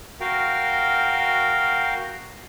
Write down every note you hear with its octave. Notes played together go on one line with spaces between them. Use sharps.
F#4 A#4 F5 G5